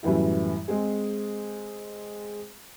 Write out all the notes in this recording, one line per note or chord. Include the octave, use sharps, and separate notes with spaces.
F#2 A2 E3 G3 E4
G#3 C4 G#4